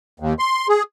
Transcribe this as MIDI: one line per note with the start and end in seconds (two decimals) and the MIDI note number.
0.20 0.33 39
0.39 0.67 84
0.69 0.83 68